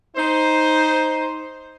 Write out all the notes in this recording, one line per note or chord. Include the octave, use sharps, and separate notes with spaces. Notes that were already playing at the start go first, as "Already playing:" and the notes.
D#4 C5